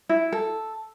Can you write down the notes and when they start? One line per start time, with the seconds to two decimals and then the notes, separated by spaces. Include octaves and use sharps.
0.09 E4
0.32 A4